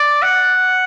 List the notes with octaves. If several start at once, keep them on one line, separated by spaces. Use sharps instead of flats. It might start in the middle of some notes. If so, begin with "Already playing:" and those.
Already playing: D5
F#5